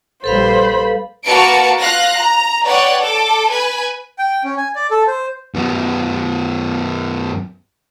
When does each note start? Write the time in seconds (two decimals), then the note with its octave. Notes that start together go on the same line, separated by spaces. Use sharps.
0.24 A#1 G3 A4 B4 C5 F5 B5
1.24 A#3 F#4 B4 A5 C#7 D7
1.80 F4 F5 F#6 A#6
2.19 A#5
2.65 B4 C#5 D5 F#5 G5
3.00 A4 D6
3.51 B4 G#5
4.19 G5
4.44 C#4
4.57 G#5
4.75 D5
4.91 A4
5.07 C5
5.54 F#2 B3